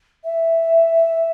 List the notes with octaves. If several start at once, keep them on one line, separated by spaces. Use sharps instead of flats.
E5